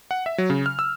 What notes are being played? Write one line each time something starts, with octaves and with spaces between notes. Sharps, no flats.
F#5
E5
F#3
C#3
F6
E6